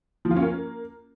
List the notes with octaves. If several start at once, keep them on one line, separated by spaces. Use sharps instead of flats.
F3
F4
C#4
A#3